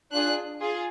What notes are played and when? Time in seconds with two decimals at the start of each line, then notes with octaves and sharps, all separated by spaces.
0.11 D4 F4 G#4 F#6
0.60 F4 G#4